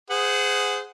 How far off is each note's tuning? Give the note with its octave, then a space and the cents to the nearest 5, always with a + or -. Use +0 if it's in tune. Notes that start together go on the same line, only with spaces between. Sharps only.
G#4 +0 C5 -30 F#5 +0